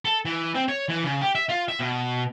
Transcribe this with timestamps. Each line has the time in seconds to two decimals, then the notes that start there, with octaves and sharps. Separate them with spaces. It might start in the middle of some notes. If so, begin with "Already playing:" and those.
0.05 A4
0.25 E3
0.55 C4
0.68 C#5
0.89 E3
1.04 C#3
1.21 G4
1.35 E5
1.49 F4
1.68 E5
1.80 B2